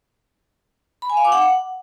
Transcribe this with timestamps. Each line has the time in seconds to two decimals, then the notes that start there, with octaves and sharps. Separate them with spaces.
1.02 B5
1.10 G#5
1.17 F5
1.25 D6
1.32 F#5